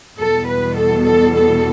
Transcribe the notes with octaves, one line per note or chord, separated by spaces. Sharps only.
E2 B2 G3 A4
B4
A4
A4
A4